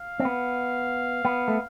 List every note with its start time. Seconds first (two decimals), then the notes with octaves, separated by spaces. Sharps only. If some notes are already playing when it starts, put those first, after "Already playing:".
Already playing: F5
0.20 C4
0.25 B3
1.25 B3
1.48 A3